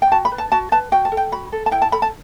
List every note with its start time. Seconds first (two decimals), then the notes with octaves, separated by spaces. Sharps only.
0.02 G5
0.11 F#4 A5
0.25 B5
0.32 B4
0.38 A5
0.52 F#4 A5
0.72 B4 A5
0.92 F#4 G5
1.05 A5
1.12 A4
1.17 G5
1.32 F#4 B5
1.52 A4
1.66 A5
1.71 E4 G5
1.82 A5
1.92 A4 B5
2.02 A5